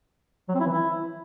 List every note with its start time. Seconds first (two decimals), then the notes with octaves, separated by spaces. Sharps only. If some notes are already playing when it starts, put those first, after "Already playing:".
0.49 F#3
0.54 C4
0.60 E4
0.66 E3
0.72 E4